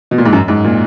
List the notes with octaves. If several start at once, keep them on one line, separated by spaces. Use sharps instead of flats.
B2
A#2
G#2
F#2
G#2
A#2